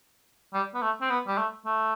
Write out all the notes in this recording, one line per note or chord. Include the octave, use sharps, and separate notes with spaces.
G3
B3
A3
C4
B3
G3
A3
A3